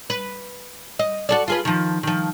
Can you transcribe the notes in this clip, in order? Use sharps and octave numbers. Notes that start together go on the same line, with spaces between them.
B4
D#5
F#4 A4 D5
F4 G#4 B4
D#3 F3
D#3 F3